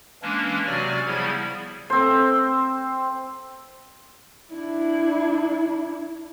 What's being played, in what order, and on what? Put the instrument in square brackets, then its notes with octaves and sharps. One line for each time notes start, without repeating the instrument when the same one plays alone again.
[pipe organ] E3 G#3 A#3 C#4 D4
C3 F#3 F#4 D5 G#5 F6
C#3 F3 G3 B3 E4 G#6
[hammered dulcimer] C4 C5
[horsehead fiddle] D4 E4